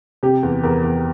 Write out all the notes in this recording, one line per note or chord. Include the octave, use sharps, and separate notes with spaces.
C3 G4
E2
E2 A#4
E2